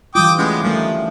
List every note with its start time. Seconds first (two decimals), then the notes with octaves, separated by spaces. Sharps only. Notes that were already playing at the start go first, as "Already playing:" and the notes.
0.15 E3 G3 F4 G5 D6 D#6
0.38 G#3 A3 B3 C#4
0.63 D#3 F3 G3 A3